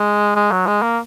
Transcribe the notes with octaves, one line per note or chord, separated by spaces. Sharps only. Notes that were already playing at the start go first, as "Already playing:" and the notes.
Already playing: G#3
G#3
F#3
G#3
A#3